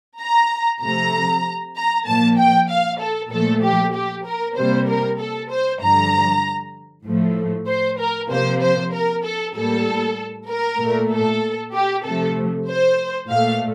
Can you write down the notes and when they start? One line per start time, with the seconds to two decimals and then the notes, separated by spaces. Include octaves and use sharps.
0.20 A#5
0.81 C3 F3 A3 A#5
1.76 A#5
2.06 A#2 F3 A#3 A5
2.37 G5
2.69 F5
2.99 A4
3.31 A#2 F3 A3 A4
3.62 G4
3.93 G4
4.25 A#4
4.56 C3 G3 A#3 C5
4.87 A#4
5.19 A4
5.50 C5
5.81 G2 D3 F3 A#5
7.06 A2 F3 A3
7.67 C5
7.99 A#4
8.30 C3 F3 A#3 C5
8.61 C5
8.92 A#4
9.24 A4
9.54 A2 G3 A#3 A4
10.48 A#4
10.79 A#2 A3
11.11 A4
11.73 G4
12.04 C3 F3 A3 A4
12.67 C5
13.29 A#2 A3 F5